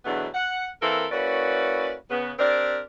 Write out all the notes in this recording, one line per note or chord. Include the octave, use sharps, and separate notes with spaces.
E2 B2 F#3 A3 B3 D4
F#5
E3 A#3 C4 A4 A#4
A#3 C#4 E4 F#4 B4 D5
C#3 B3
C4 D4 G4 A#4 D5